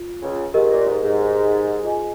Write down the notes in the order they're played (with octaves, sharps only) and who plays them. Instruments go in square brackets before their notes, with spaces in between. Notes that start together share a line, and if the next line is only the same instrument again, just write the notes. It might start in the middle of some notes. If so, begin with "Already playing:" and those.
Already playing: [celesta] F4
[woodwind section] C#2 C#3
[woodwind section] G#2 [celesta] G4 A#4 D#5
[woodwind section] A#2
G#2
G#2
[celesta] F4 G#4 D#5 G#5